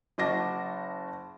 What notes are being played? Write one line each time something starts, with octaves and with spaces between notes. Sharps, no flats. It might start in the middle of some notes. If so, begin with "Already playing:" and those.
F#1 F#4 D#5 A5 D6 A#6